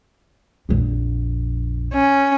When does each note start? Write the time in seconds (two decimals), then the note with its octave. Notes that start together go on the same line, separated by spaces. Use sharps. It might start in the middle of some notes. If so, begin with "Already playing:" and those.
0.69 A#1 F2
1.94 C#4